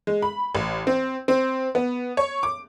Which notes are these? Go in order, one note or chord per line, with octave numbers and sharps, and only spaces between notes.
G#3
B5
A1
C4
C4
B3
C#5
D6